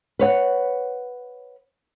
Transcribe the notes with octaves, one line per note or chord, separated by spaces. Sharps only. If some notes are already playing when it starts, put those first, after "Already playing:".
B4 C#5 F#5